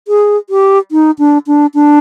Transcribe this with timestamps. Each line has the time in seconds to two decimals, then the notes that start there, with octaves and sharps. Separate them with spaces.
0.08 G#4
0.50 G4
0.92 D#4
1.19 D4
1.47 D4
1.74 D4